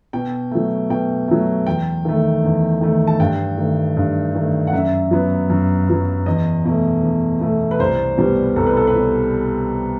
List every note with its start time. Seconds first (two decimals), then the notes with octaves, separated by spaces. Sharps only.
0.13 B2 G5
0.51 F#3 A3
0.90 B2 G5
1.28 F#3 A3
1.67 E2 G5
2.05 D#3 A3
2.44 E2
2.81 D#3 A3
3.07 A5
3.20 G2 G5
3.58 D#3 A3
3.97 G2
4.35 D#3 A3
4.67 F#5
4.73 F#2 E5
5.11 F#3 B3
5.50 F#2
5.88 F#3 B3
6.26 E2 D#5
6.65 B2 A3
7.03 E2
7.41 B2 A3
7.71 B4
7.79 C2 C5
8.18 B2 G3 B3
8.56 C2 A4
8.67 B4
8.77 A4
8.87 B4
8.95 B2